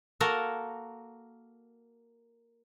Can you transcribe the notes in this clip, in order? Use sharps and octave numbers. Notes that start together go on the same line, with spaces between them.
A#3 F#4 A4 A#4